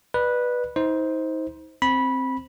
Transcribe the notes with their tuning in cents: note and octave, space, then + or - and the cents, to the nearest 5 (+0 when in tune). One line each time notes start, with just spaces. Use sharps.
B4 -10 D5 +35
D#4 +35 C5 -5
C4 +5 B5 -15